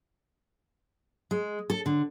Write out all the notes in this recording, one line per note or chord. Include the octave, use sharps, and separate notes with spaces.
G#3
A4
D3